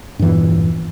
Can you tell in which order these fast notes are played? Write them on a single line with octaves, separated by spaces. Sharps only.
G2 E3 E2 A#2